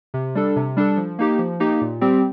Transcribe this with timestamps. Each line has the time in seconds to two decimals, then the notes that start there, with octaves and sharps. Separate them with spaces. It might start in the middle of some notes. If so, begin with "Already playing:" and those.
0.14 C3
0.35 G3 D4 A4
0.56 C3
0.77 G3 D4 A4
0.97 F3
1.19 A#3 D#4 G4
1.39 F3
1.60 A#3 D#4 G4
1.81 A#2
2.01 G3 C4 G4